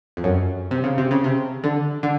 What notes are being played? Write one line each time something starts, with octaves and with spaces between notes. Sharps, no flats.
F2
F#2
C3
C#3
C3
C#3
C3
D3
D3